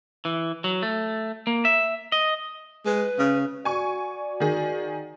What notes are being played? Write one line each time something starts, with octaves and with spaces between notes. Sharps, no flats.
E3
F#3
A3
A#3
E5
D#5
G#3 B4
C#3
F#4 D5 G#5 C#6
D#3 G#4